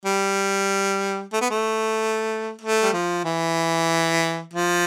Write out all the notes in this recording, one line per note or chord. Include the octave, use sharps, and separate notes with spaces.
G3
A3
B3
A3
A3
G3
F3
E3
F3